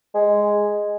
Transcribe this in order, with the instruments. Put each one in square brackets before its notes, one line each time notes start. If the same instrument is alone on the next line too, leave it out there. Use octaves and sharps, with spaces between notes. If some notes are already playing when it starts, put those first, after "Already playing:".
[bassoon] G#3